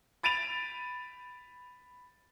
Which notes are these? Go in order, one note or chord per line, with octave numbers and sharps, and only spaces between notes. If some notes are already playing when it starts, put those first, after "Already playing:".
B5 A6 D7 D#7 F7